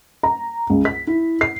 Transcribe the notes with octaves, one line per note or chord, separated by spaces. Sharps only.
A#5
C#2
B6
E4
C7